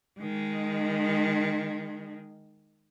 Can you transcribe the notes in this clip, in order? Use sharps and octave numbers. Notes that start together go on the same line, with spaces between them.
D#3 G#3